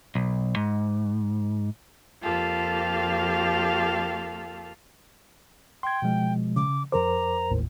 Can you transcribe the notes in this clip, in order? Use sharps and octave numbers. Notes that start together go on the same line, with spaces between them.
B1
G#2
F2 A#3 F4 G4 A4 F5
G5 C6 G#6
B2 F3 G#3
C#3 D6
F2 A#4 C5 A#5 D6
G#1 D#2 A2